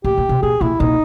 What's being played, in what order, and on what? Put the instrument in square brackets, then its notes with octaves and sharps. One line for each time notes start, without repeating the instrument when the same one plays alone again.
[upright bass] A2 [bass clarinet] G4
[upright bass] A#2
B2
[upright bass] A#2 [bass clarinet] G#4
[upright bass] A#2 [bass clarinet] E4
[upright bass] A#2 [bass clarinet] D#4